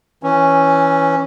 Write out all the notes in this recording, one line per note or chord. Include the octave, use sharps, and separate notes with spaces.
E3 C#4